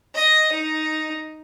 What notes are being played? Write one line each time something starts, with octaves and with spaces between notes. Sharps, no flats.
D#5
D#4